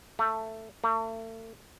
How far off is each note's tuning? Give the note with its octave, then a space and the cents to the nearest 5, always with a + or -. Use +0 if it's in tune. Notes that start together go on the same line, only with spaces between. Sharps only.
A3 +10
A3 +35